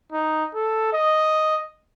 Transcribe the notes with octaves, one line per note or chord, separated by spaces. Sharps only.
D#4
A4
D#5